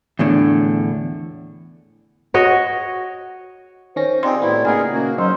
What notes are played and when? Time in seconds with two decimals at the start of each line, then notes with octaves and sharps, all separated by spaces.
0.19 E2 A2 D3
2.34 F#4 C#5 D#5
3.96 D#3 C#4 C5 A#6
4.23 C4 D#4 F4 G4 G#4 D5 C6
4.42 A2 B3 C4 E4 F#4
4.65 A#2 C#3 D#4 G#4 A#4 F#5 G#5
4.92 A#3 C#4 F#4
5.18 F#3 C#4 D#4 C5 C6